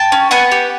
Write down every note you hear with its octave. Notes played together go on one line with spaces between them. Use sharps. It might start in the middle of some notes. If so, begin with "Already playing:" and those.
Already playing: G5 A5
C#4
B3 F#5 G#5
G4